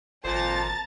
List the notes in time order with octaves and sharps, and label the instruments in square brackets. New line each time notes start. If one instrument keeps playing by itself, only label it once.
[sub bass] G#1 [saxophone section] F2 A#2 [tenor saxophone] C5 [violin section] A5 A#5 A6